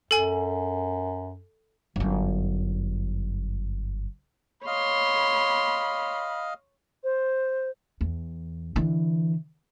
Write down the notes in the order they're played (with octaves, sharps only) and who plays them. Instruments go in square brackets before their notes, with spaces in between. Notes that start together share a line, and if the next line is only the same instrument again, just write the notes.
[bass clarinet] F#2 [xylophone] A4 G#5
[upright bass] G1 F#2
[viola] C#5 C6 [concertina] D#5 F5 [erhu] B5
[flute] C5
[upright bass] E2
D3 E3